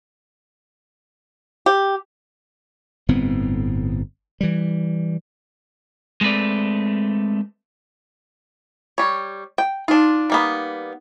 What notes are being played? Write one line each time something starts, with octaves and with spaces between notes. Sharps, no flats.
G4
G1 A2 B3 C4
E3 G3
G#3 A3 C4 B4 D5
G3 C#5
G5
D4 D#4 F4
G3 A#3 B3